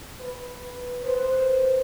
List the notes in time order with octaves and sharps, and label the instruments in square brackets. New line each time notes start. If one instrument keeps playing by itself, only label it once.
[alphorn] B4
[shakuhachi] B4 [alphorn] C5